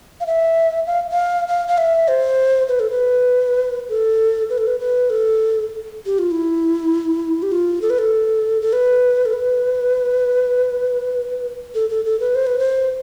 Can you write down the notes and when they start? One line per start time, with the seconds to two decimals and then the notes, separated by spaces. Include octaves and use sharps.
0.20 F5
0.27 E5
0.87 F5
1.12 F5
1.48 F5
1.68 F5
1.78 E5
2.08 C5
2.69 B4
2.80 A4
2.90 B4
3.89 A4
4.50 B4
4.58 A4
4.67 B4
4.80 B4
5.10 A4
6.06 G4
6.19 F4
6.31 E4
7.43 G4
7.52 F4
7.82 A4
7.90 B4
7.99 A4
8.62 A4
8.73 B4
9.25 A4
9.33 B4
11.75 A4
11.90 A4
12.05 A4
12.20 B4
12.35 C5
12.47 B4
12.59 C5